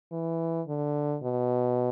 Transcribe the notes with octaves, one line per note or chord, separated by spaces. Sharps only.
E3
D3
B2